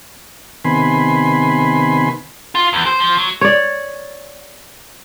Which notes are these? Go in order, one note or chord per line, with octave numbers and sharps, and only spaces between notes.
C3 D#3 B3 G#5 B5 C6
F4
E2
C5
F3
F#3
C#5 D5